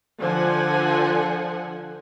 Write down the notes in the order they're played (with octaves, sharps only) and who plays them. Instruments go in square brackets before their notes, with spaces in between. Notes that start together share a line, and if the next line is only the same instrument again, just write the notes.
[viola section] D3 F3 C5 F#5 G#5